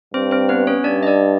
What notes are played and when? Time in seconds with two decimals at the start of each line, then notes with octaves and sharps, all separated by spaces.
0.14 G2 C4 C5
0.31 C4 C5
0.49 B3 B4
0.67 C#4 C#5
0.84 G2 D4 D5
1.03 D#5
1.07 D4 D5